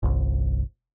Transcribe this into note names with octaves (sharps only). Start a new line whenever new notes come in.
G1 C2